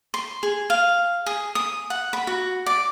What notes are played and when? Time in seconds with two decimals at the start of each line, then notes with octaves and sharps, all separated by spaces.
0.14 C6
0.43 G#4
0.70 F5
1.26 G#4
1.55 D#6
1.90 F#5
2.13 B5
2.27 F#4
2.66 D5